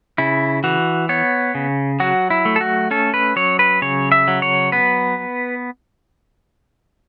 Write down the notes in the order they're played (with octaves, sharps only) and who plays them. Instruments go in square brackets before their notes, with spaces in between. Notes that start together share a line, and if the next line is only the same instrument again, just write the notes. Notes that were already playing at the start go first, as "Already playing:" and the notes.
[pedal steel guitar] C#3 E4
E3 F#4
B3 C#5
C#3
F#3 F#4
E4
A3
A4
F#4
C#4 A4
B4
F#3 C#5
B4
C#3 C#5
E5
F#3
C#5
B3 B4